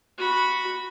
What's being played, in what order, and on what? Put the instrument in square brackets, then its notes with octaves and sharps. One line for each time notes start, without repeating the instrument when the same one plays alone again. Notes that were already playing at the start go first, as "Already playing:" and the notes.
[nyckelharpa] F#4 B5